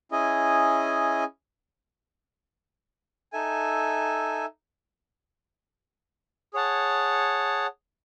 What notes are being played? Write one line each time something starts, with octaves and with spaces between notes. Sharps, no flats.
C#4 E4 G#4 D#5 G#5
D#4 A4 E5 G#5
G#4 C#5 F#5 A5